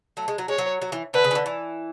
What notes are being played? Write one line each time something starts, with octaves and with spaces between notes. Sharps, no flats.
F#3 A3
G#3
F#3
G#3 C#5
F#3
F#3
E3
D3 B4
C#3
E3
D3
E3